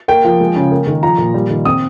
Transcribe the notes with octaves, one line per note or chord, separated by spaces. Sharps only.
A#3 G5
F3
G#3
C#3
A#3
D#3
F3 A#5
A#2
G3
D#3
C4 D#6